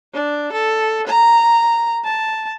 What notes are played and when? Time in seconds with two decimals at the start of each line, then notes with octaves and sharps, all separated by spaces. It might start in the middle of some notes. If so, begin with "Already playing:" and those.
0.14 D4
0.52 A4
1.07 A#5
2.04 A5